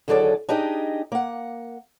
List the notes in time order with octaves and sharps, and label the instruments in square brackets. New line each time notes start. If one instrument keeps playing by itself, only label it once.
[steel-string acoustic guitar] D#2 D3 F#3 G#4 A4 D5
D4 D#4 G4 G#4 D#5
A#3 F#5